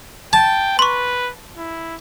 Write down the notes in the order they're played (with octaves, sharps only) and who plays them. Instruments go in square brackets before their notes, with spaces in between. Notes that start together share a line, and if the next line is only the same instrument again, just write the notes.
[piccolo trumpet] G5 [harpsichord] A5
[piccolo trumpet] B4 [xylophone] C6 C#6
[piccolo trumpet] E4